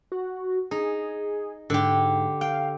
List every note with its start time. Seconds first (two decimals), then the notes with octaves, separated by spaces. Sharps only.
0.12 F#4
0.71 D#4 G#4
1.70 G#2 D3 G4
2.41 F5 G5